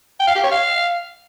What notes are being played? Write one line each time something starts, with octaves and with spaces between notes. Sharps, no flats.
G5
F5
G4
C#5
F5